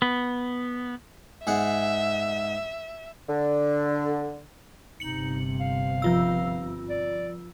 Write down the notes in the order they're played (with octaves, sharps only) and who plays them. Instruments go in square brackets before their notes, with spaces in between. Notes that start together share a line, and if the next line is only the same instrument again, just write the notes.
[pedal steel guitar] B3
[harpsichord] G#2 G#4 F#5 [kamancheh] E5
[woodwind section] D3
[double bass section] G1 C3 [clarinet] D#4 [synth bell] C#7 F#7
[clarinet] F5
[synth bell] F3 F4 E6
[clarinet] D5